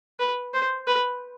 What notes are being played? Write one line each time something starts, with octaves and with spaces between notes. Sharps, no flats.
B4
C5
B4